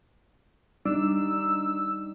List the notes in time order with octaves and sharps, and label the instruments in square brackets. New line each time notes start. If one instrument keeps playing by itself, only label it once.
[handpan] G3 D#4 [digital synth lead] D4 [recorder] E6